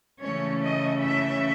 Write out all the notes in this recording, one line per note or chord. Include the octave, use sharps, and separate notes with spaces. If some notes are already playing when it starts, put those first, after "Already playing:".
C#3 E3 A3 C#4 C#5
D#5
E5